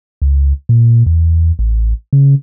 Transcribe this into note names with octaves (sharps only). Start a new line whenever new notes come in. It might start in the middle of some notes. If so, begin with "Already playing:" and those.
C#2
A#2
E2
A1
C#3